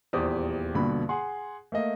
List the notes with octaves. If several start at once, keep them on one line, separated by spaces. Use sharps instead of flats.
D#1 E2 G4 C5 D5 D#6
A#1 G2 B2 D3 B5
G#4 F#5 C6
A3 A#3 D#5